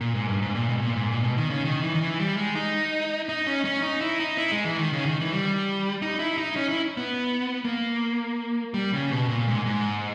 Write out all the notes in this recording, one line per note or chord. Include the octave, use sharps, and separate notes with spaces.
A#2
G#2
G2
G#2
A#2
B2
G#2
A#2
G#2
A#2
B2
D#3
C#3
D#3
E3
D#3
E3
G3
G#3
D#4
D#4
C#4
C#4
D#4
E4
D#4
E4
G#3
E3
D#3
C#3
D#3
E3
G3
D#4
E4
D#4
C#4
E4
B3
A#3
G3
C#3
B2
A#2
G#2
G#2